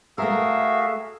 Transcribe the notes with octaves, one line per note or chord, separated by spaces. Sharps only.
A3 F#4 G#4 A#4 E5 F5